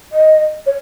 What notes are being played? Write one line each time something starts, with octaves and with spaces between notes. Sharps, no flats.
D#5
C#5